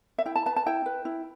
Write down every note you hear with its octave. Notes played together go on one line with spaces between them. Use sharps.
E5
E4 G5
A5
B4 A5
A5
E4 G5
B4
E4